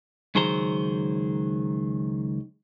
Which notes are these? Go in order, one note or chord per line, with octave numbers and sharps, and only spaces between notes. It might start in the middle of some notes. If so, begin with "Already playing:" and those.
C#2 D#3 F#3 G#4 C5 A#5